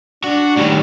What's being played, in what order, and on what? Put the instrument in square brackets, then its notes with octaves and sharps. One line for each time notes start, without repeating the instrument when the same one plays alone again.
[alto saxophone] D4 [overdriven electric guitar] F#4
[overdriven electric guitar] A2 D#3 [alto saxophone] G3